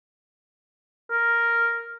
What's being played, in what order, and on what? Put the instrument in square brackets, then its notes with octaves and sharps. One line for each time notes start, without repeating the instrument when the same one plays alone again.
[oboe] A#4